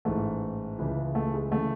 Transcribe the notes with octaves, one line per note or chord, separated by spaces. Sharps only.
A1 G#2 E3 A3
C#2 C#3 E3
A3
G#3
C#3 E3 A3